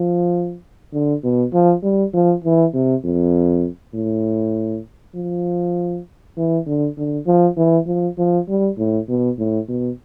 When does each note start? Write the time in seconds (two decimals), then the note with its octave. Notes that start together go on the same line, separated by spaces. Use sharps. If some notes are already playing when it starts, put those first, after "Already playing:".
Already playing: F3
0.93 D3
1.24 B2
1.53 F3
1.83 G3
2.14 F3
2.44 E3
2.74 C3
3.04 F2
3.94 A2
5.15 F3
6.37 E3
6.67 D3
6.98 D3
7.27 F3
7.57 E3
7.87 F3
8.18 F3
8.48 G3
8.78 A2
9.09 B2
9.38 A2
9.69 B2